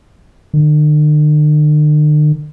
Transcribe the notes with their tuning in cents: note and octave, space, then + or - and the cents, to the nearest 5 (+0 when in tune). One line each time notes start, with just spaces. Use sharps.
D3 +45